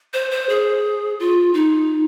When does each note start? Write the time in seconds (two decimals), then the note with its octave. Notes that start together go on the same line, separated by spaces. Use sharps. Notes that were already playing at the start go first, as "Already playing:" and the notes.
0.13 C5
0.31 C5
0.49 G#4
1.20 F4
1.54 D#4